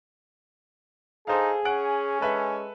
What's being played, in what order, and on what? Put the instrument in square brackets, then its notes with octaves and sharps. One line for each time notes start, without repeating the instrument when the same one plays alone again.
[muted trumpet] D#4 [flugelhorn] G#4 [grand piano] A4 C5 F5
[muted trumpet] C#4 [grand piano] F#5 F#6 D7
[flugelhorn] G#3 [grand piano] A4 B4 E5